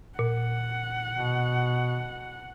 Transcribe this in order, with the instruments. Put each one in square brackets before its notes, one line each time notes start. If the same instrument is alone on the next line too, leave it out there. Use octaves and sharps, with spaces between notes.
[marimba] A#2 [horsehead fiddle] F#5
[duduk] B2